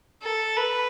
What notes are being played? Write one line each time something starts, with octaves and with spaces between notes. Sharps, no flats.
A4
B4